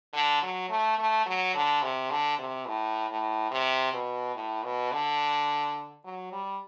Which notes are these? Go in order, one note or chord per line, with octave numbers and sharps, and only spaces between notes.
D3
F#3
A3
A3
F#3
D3
C3
D3
C3
A2
A2
C3
B2
A2
B2
D3
F#3
G3